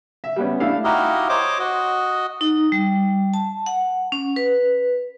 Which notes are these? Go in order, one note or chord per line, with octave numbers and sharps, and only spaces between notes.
E5
G3 B3 C#4
A3 D4 E4 F5
D#4 E4 F#4 G4 D#5 F5
C5 C#5 D#5 D6
F#4 D#5
D#4
G3
A5
F#5
C#4
B4